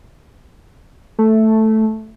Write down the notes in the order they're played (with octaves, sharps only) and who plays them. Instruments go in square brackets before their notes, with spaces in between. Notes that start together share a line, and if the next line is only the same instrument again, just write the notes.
[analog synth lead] A3